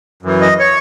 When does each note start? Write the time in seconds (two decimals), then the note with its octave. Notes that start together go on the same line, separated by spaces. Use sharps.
0.22 F#2 E3
0.41 D#5
0.59 C#5